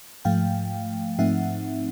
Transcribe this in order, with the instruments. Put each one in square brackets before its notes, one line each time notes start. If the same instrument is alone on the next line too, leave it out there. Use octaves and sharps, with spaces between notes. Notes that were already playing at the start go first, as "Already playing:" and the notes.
[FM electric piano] G#2 F3 A3 F5 G5
G#2 F3 A3 C4 D#4 E5 F#5